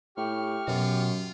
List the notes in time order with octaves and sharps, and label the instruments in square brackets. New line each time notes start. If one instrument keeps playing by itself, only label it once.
[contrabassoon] A2 [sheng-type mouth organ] G4 C#6 F6
[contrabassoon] F#2 [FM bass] B2 [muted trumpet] F4